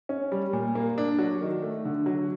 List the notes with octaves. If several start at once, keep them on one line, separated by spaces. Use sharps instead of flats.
C#4
G3
A#2
A#3
D4
F#3
D#3
A3
D3
F#3